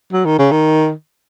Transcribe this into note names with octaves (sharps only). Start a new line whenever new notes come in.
F#3
D#3
C#3
D#3